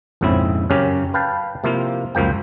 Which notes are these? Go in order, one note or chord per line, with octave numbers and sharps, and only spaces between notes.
A#1 F2 G#2 C#3 C4 E4
F#2 C#3 C#4 G4 A#4
B4 F5 G5 A5
C3 F3 A#3 E4 F4
C#2 F#2 F3 A#3 G5